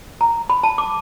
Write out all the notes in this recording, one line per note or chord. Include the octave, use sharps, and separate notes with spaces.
A#5
B5
A5
D6